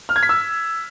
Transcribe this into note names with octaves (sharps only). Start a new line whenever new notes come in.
F6
G#6
B6
E6